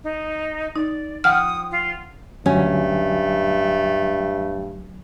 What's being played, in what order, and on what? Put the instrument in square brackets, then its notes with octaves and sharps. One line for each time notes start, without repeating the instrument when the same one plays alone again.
[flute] D#4
[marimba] D#4 [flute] D5
[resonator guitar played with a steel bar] F3 F#5 G5 [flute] D#6 [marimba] F6
[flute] F4
[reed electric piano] D2 F#3 G#5 [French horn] G2 [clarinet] A3 [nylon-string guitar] C#4